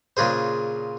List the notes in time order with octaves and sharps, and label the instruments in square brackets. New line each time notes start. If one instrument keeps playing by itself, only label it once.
[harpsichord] A#2 C#3 D4 G#4 C5